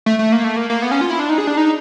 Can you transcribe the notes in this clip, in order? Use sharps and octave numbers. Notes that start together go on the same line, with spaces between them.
A3
A3
A#3
A3
A#3
A#3
B3
C#4
F4
E4
D4
D#4
G#4
D4
D#4